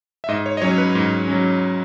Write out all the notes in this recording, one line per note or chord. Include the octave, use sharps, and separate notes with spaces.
E5
G#2 D#5
C#5
D#5
F#3 C#4 C#5
B4
G#2
F#3 C#4